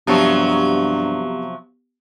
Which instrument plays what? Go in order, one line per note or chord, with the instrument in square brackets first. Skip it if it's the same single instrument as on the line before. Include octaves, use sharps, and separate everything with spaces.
[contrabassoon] G2 [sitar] C3 F3 F#3 [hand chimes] B3 G4